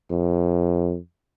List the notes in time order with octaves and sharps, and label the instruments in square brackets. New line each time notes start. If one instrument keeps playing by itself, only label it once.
[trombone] F2